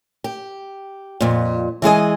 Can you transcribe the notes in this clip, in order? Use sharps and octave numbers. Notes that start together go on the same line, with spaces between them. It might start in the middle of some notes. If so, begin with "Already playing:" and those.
G4
F2 A#2
E3 G#3 G#4 D#5